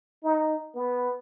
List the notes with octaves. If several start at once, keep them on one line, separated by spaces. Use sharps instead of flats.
D#4
B3